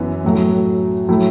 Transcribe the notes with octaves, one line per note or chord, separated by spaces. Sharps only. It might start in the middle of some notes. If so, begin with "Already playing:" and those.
Already playing: F#2 E3 B3
A2 F#3 A3
A2 F#3 A3 E4